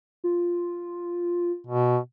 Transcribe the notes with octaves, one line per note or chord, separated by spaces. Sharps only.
F4
B2